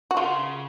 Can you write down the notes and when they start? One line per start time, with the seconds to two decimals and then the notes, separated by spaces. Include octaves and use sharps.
0.11 F#4
0.17 C#3 F4